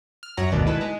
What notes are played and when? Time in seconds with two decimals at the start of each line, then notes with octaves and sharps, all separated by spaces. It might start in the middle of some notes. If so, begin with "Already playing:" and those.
0.23 F6
0.37 F#2 F#3 F#5 A#5
0.52 G#1 D2 B2 D#3 B3 D5
0.66 D#3 G#3 E4 A4 B4
0.81 G#3